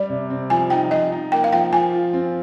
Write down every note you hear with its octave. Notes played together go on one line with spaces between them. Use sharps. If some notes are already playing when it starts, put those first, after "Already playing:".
Already playing: G3 D5
C3
C4
F3 G#5
D#4 G5
F3 D#5
D#4
A#3 G5
F5
F3 G5
F3 G#5
F4
C4